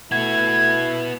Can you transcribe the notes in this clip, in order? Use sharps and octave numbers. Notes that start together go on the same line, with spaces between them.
A3 B3 E4 F#4 G#6